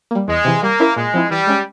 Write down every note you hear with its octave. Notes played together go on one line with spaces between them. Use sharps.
G3 A#3
E2 G#3
C3 E3
G3 A#3
C#4 E4 A#4 E5
A#2 G#3
F3 C4 E4
E3 G3
G#3 C#4